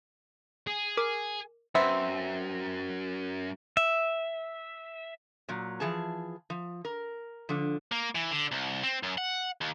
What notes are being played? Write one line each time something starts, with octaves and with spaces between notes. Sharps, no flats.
G#4
A#4 D6
F#2 B3 C4 E5
E5
A#2 F#3
E3 F3 G#4 A5
F3
A#4
D3 F3
A#3
E3
D3
C2
C4
F#2
F#5
D#2